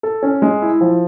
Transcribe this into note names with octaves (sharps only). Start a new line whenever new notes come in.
A4
C#4
G#3
E4
F3